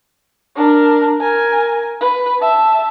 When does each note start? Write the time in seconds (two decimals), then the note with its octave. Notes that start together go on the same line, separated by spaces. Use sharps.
0.56 D4 A#4
1.20 A#4 G#5
2.01 B4
2.40 E5 A5